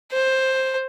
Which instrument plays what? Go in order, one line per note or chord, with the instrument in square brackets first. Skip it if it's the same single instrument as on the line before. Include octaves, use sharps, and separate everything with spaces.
[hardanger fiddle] C5